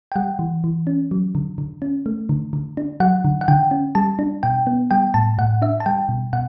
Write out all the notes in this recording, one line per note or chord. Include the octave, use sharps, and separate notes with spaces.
G5
G3 F#5
E3
E3
C#4
F#3
D3
D3
C#4
A3
D3
D3
D4
F#3 F#5
D3
F#5
D3 G5
C#4
G3 A5
D4
B2 G5
B3
G3 G5
A2 A5
A2 F#5
D4 E5
A5
G3 G5
B2
B2 F#5